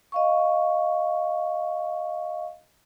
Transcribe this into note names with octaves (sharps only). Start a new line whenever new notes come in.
D#5 F5 C#6